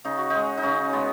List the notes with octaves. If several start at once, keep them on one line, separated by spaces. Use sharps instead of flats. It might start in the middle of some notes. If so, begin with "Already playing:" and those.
C#3 D#4
F#4
G#3 D#4
D#4
C#3 C#4
G#3 B3